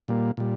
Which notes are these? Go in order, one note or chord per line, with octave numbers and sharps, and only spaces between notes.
A#2 G3 A#3
A#2 G3